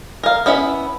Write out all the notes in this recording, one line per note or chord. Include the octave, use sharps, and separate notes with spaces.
A#4 F5
B3 C#4 E4 E5